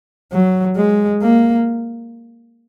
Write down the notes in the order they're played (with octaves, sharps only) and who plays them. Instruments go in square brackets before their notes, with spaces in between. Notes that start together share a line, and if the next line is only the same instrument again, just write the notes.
[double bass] F#3
G#3
A#3